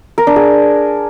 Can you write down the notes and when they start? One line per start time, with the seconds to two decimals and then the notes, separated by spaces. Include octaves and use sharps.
0.18 A#4
0.27 D4
0.36 G#4